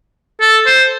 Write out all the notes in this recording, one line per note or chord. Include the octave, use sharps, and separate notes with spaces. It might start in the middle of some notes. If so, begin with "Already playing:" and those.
A4
C5